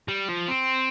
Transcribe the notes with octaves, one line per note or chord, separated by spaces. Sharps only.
G3
F3
C4